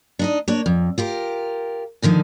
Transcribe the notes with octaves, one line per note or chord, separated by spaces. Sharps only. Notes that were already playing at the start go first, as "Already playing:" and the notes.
D4 D#4 D#5
A#3 D4 C#5
F2
F4 G4 A#4
A#2 D3 D#3 F3